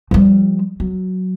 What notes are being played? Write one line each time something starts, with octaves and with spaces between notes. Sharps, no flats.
F3 G3
F#3